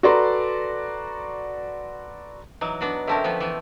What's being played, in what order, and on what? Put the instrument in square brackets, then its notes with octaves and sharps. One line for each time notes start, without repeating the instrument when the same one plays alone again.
[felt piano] F#4 A4 B4 D5 A#5 C6
[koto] E3 F#3 [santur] D#4
[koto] B3 D4 F#4
[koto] D3 C#4 A#4 [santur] A3 C4 E5
[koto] F3 B3
E3 B3